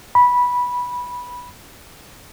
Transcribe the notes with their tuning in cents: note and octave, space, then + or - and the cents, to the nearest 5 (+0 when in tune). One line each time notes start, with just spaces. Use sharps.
B5 -10